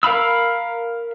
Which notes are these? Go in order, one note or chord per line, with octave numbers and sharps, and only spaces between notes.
A#4 F5 A#5 B5 E6